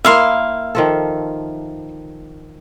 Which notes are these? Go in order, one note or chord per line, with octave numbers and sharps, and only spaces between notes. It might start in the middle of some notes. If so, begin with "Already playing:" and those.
A#3 E4 E5 F5 C6
D#3 F3 A4